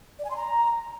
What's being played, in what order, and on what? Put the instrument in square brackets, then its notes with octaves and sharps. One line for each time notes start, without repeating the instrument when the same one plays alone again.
[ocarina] D5
G#5
C6
A#5